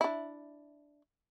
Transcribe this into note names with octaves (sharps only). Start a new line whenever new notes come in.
D4 E4